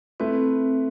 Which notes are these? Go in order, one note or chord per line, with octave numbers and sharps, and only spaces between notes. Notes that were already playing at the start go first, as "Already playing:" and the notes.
A3 C4 E4 B4